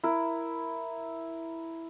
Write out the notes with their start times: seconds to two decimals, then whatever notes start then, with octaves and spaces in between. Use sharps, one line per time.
0.04 E4 A#4